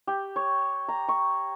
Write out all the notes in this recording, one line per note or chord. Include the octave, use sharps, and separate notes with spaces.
G4
C#5
A#5
C#6